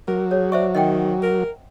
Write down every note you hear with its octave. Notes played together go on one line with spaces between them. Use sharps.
F#3 A#4
G#4 C#5
C5 D5 E5 C#6
D#3 D#5 F#5 G5
A#4